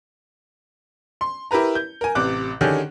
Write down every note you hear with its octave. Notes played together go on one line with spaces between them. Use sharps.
C6
E4 G4 A#4 B4 A#5
G6
A#4 G#5
A1 C3 D6 F#6
D3 D#3 C#4 G4 G#4